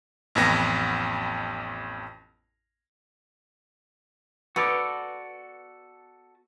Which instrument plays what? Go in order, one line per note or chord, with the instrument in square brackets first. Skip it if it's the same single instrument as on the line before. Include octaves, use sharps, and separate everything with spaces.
[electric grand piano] A1 F2 B3 A#6
[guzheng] B3 [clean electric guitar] F#4 A4 D5